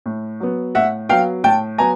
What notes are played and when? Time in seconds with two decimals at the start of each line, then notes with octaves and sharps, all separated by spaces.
0.06 A2
0.40 F#3 B3
0.75 A2 E5 F#5
1.09 F#3 B3 F5 G5
1.44 A2 G5 A5
1.78 F#3 B3 G#5 A#5